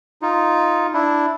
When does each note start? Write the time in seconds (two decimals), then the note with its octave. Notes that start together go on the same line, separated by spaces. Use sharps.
0.22 D#4 F4
0.94 D4 E4